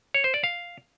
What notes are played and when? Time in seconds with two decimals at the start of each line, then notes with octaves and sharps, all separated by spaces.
0.14 C#5
0.24 C5
0.34 D5
0.44 F5